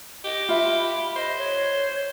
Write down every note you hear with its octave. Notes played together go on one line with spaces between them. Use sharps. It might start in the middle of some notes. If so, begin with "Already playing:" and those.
G4 D#5
F4 E5 B5
C5 D#5
C#5